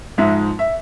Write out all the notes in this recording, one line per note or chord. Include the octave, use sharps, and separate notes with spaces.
G#2 F3 G#3 E5
E5